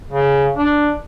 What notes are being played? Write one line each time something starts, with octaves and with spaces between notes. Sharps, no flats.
C#3
D4